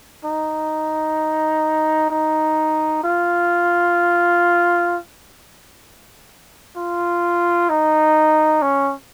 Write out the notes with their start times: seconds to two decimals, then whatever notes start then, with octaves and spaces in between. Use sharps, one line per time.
0.24 D#4
2.10 D#4
3.04 F4
6.77 F4
7.70 D#4
8.62 C#4